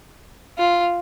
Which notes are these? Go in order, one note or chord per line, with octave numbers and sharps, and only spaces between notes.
F4